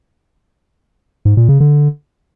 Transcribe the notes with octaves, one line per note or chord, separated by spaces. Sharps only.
G#2
A#2
C#3
D3